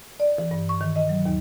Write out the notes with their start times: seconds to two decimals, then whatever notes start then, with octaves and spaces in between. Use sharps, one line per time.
0.20 D5
0.38 E3
0.51 G2
0.69 C#6
0.81 D#3
0.96 D#5
1.09 F#3
1.25 D#2